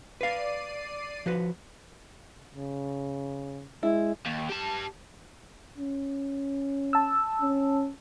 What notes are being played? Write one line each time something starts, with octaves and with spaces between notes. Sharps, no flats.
B4 D5 F5 C7 D#7
F3 F#4 B4
C#3
G#3 E4
D#2
G4 A5
C#4
A5 E6
C#4